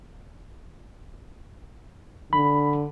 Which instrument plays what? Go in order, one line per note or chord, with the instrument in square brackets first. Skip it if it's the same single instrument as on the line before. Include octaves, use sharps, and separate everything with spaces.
[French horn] D3 [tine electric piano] B5